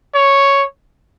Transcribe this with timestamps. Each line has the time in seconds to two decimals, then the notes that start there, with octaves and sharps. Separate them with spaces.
0.15 C#5